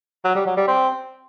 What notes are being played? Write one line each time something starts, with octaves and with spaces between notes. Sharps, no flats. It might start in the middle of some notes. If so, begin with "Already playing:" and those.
F#3
G3
F#3
G3
C4